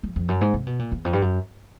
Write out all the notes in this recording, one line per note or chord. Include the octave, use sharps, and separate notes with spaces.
F2
F2
F#2
G#2
C3
B2
A#2
E2
F2
G2
F#2